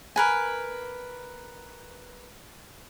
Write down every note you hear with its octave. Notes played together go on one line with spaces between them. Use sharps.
A#4 B4 G#5